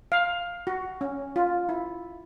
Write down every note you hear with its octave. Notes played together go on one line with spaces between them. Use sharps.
F5
F#4
C#4
F4
E4